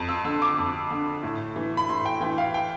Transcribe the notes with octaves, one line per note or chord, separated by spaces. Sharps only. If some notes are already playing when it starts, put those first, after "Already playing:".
Already playing: F2
E6
D3 E6
D6
F2
D3
A2
E3
B5
A2 C6
G5
E3 G5
F5
G5